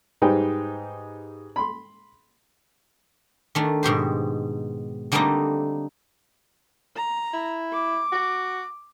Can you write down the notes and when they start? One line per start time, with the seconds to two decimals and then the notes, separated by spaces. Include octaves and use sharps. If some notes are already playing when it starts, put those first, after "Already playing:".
0.22 G#2 G3 D#4 B4 C5 G5
1.56 B5 C6
3.55 D#3 A3 D4
3.83 G#2 B2 G4 C5
5.12 D3 G3 A3 A#3 C4 D#4
6.96 A#5
7.33 E4
7.73 D6
8.12 F#4